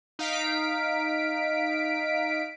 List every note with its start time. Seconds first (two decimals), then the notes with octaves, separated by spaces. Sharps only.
0.19 D#4 F5 B6 D7